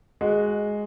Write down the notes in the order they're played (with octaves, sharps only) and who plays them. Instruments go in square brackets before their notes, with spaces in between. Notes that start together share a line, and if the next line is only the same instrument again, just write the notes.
[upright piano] G#3 F#4